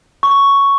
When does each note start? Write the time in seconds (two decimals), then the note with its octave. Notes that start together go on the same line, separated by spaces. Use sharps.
0.23 C#6